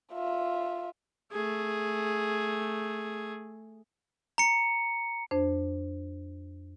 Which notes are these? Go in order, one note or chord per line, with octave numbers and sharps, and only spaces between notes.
F4 E5
A3 G#4
A#5 C#7
F2 D4 C5